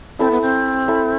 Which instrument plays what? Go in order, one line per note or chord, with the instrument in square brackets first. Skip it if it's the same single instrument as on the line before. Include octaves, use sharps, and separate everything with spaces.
[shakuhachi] C4 [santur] E4 A4 E5
[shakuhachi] B3
C4
[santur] E4 A4 E5